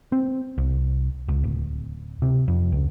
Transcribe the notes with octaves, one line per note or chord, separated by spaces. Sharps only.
C4
C2
C#2
D1
C3
F2
C#2